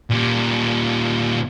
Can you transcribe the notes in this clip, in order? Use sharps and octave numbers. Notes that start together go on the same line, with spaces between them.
A#2 G3